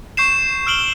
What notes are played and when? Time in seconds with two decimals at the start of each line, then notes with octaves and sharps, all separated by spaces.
0.17 C#6 G6 C7 E7
0.66 E6 F6 D7 F#7 G7